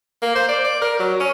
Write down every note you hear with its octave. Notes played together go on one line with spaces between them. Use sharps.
A#3
C5
D5
D5
A#4
F#3
C#4